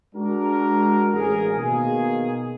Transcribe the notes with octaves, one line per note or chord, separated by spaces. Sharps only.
G#3 D4 F#4 A#4
A1 G#4 A#4
B2 D#3 A#3 G#4